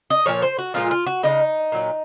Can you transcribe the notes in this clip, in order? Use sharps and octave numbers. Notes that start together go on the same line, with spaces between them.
D#5
A#2 F3 C#5
C5
F#4
A#2 F3 G#3 F4
F4
F#4
C#3 F3 G#3 D#4
A#2 F#3